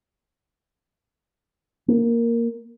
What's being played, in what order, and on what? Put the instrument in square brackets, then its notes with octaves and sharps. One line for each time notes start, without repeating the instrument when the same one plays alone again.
[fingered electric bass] A#3